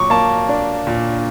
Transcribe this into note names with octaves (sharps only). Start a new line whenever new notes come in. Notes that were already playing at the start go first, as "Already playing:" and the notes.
Already playing: A#2 F#3 C#6 D6
A#3 A5
D4
A#2